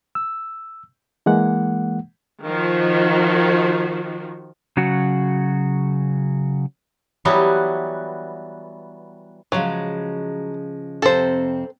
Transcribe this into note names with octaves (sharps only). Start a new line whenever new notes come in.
E6
E3 G#3 A#3 F#5
D#3 F3 F#4
C#3 F#3 F#4
E3 F#3 G3 B3
C#3 F3 F#3 G#3
F2 C3 C4 A4 C5